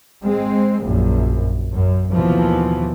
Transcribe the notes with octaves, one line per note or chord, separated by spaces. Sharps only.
G#3 C4
A#1 F#2
F#2
D#2 B2 E3 F3